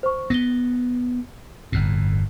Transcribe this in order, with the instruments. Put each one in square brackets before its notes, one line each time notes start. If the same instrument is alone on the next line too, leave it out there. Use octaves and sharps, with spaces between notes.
[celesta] C5 C#6
[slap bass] B3 [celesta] A#6 G7
[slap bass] G1 F2 A2